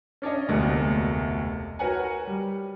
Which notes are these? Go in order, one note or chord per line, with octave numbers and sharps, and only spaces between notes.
C#4 D4 C#5 D#5
F1 D2 B2 G#3 A#3 D#5
F#4 A#4 B4 C#5 F#5 G#5
G3